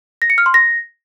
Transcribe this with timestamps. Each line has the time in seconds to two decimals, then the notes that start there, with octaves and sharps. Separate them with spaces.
0.22 A#6
0.30 C#7
0.38 F6
0.46 C6
0.54 A#6